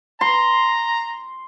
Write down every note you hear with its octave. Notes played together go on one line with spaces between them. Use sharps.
A#5 C6